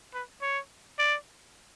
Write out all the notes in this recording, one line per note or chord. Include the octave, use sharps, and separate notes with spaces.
B4
C#5
D5